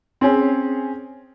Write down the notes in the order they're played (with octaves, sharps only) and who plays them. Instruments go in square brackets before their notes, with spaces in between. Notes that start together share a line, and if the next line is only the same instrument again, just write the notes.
[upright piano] C4 C#4 G#4